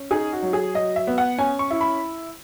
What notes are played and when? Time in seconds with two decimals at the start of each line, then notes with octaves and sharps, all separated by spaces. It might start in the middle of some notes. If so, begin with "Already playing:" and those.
Already playing: C#4
0.11 D#4 G#4
0.32 F#4
0.42 F#3
0.53 G#4
0.74 F#3 D#5
0.96 E5
1.07 B3
1.18 F#5
1.38 C#4 G#5
1.59 C#6
1.70 E4
1.81 B5